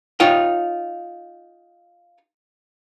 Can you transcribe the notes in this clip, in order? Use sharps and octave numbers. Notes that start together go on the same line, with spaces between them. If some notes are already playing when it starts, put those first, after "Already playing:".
D#4 F4 C#5 G5